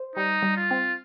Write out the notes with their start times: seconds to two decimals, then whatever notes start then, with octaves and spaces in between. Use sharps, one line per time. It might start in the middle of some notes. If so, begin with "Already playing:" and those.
Already playing: C5
0.16 G3 D#4
0.42 G3
0.57 F4
0.71 C4